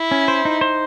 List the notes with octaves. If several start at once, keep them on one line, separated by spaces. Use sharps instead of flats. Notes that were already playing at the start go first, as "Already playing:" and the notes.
Already playing: E4
C#4
C5
D#4
C5